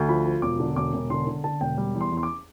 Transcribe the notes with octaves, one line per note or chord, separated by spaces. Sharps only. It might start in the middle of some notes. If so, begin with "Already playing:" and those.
Already playing: D2
F3 B5
F3
E1 D6
D3
E1 D6
E1
D3 C6
D3
D3 A5
E1 G5
G3
E2
C6
E2
C6
D6